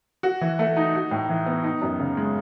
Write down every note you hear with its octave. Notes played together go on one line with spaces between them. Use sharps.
F#4
E3
A3
D#4
F#4
A2
E3
B3
D#4
F#2
C#3
G#3